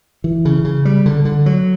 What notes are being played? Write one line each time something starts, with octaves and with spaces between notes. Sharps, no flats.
E3
C#3
C#3
G3
D3
D3
F#3